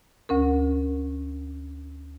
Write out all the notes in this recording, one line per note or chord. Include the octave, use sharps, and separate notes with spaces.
D2 C#4 A#4